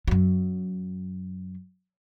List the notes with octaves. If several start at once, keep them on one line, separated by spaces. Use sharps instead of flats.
F#2 F#3